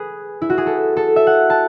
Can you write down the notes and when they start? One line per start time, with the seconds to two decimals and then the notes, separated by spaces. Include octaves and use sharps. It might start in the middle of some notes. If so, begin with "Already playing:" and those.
Already playing: G#4 B4
0.42 E4
0.50 F#4
0.58 G#4
0.66 A4
0.97 A4
1.16 E5
1.27 F#5
1.50 A5